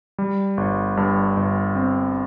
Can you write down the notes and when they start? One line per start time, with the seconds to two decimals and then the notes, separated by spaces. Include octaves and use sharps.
0.18 G3
0.57 G1
0.97 G2
1.37 G1
1.75 C4